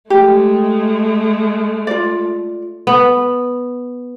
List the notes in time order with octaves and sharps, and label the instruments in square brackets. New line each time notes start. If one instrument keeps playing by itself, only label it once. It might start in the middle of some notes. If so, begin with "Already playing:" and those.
[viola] G#3 A3 [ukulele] G4
[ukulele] F4 D5
[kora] B3